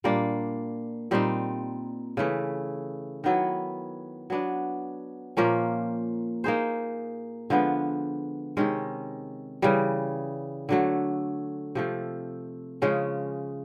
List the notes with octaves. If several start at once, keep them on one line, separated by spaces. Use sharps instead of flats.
A#2 G3 A#3 D4
A#2 G3 C4 D#4
C#3 E3 A3
D#3 F#3 B3 E4
F#3 B3 D4
A#2 F3 A#3 C#4
A#3 D#4 G#4 C5
D3 F3 G#3 B3
C3 D#3 G#3 C#4
C#3 E3 G3
D3 F#3 A3
C3 F3 A3
C#3 F3 G#3 C#4